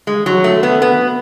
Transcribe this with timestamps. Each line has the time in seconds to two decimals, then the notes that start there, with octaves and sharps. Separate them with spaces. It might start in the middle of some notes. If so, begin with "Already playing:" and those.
0.07 G#3
0.26 F#3
0.44 A3
0.63 B3
0.82 B3